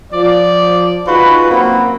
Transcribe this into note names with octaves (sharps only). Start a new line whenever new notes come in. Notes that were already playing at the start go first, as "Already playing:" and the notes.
F3 D5
D#4 F4 F#4 G#4 B4
F#2 A#3 C4 F#5 B5